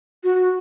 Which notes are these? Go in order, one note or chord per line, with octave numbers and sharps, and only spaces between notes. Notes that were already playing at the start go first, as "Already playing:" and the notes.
F#4